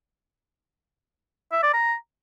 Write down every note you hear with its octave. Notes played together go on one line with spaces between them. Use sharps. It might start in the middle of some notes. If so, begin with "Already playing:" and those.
E5
D5
A#5